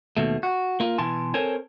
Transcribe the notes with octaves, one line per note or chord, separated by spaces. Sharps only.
D#2 B2 A3
F#4
A#3 F4
B2 E3 E4 G#5 A5 C6
C4 A4 A#4 C5 C#5 G#5